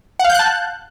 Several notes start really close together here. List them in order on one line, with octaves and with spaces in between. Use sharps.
F#5 F5 G6 F#6 A5